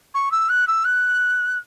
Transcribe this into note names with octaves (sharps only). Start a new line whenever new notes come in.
C#6
E6
F#6
E6
F#6